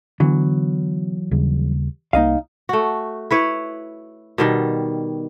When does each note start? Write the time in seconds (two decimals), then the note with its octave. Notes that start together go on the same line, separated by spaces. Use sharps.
0.20 D3 E3 F#3 B3
1.31 D#2 C#3 G3
2.13 C2 A#3 D#4 D#5 F5
2.69 A3 F#4
3.31 E4 B4 C#5
4.38 B2 D#3 G3